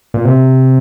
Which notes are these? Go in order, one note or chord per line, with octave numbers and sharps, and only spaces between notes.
A#2
C3